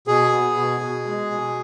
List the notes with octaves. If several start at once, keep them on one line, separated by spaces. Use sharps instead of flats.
B2 G#4
B3
B2
B2
G#3
B2